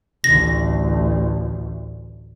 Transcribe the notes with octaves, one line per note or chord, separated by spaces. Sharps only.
A1 D2 A#6